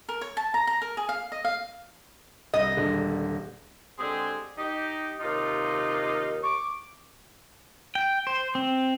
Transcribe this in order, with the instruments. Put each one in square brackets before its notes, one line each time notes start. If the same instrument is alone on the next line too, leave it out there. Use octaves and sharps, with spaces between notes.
[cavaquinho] A#4
C#5
A5
A#5
A#5
A#4
G#4
F5
D#5
F5
[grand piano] C2 [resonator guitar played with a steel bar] D#5
[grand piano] D#1 D3 G#3
[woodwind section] D3 G#3 C4 G4 G#4
D#4 G4
D#2 C3 D#4 F4
C#6 D6
[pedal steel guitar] G5
C5
C4